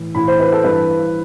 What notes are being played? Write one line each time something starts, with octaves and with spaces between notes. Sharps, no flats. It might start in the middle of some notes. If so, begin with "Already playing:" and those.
Already playing: A2 E3
A2 E3 B5
C5
B4
A4
G2 E3 B4